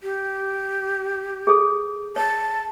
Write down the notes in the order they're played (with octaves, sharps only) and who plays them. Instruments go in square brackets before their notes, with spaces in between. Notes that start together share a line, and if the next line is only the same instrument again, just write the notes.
[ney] G4
[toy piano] G#4 A4
[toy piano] C#5 [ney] A5